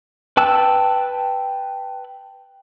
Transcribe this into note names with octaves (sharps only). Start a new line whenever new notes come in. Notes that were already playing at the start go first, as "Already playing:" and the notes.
B4 G5 A5 E6 F#6